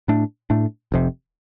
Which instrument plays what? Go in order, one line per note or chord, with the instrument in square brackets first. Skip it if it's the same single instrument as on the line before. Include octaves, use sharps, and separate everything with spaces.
[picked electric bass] A2 A3 D4
A2 A3 D4
F1 F2 C3